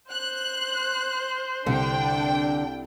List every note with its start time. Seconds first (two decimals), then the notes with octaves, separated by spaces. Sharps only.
0.11 C5 F#6
1.66 C2 D3 D4 G5